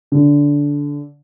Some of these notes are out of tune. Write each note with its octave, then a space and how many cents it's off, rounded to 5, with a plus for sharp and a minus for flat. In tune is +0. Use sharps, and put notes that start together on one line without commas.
D3 -15